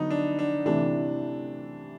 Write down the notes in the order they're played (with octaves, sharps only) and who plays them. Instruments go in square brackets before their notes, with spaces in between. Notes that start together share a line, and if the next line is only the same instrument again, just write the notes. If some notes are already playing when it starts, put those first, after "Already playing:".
Already playing: [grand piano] D3 F#3 B3 [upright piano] D#4
[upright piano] D4
D4
[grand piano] C3 E3 A3 [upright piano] D4